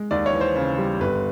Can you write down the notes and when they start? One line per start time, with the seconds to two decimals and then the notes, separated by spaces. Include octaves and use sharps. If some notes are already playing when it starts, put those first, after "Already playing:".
Already playing: G#3
0.11 D#2 D5
0.26 C#5
0.33 E3
0.41 C5
0.56 C#3
0.78 G3
1.00 G1 B4